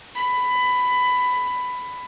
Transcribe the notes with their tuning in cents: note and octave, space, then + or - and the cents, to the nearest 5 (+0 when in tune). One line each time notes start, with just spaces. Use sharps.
B5 +15